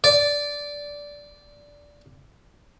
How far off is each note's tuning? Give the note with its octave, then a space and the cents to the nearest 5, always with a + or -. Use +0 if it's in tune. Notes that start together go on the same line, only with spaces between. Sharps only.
D5 -10